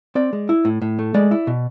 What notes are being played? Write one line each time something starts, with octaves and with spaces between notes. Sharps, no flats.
C4 D5
G#3
E4
A2
A2
A3
G#3 D5
E4
B2